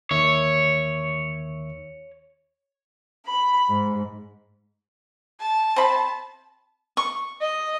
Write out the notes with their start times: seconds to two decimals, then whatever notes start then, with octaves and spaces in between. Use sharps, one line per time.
0.11 D#2 D#3 C#5 E5
3.26 B5
3.70 G#2
5.40 A5
5.76 C4 B5
6.97 C#6
7.41 D#5